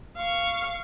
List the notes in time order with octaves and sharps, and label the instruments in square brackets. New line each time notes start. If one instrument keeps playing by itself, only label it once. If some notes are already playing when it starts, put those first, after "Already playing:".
[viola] F5 C#6